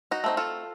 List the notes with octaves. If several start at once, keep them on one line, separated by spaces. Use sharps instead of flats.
D#4 F#4
A3 C4 D#4
F4 A4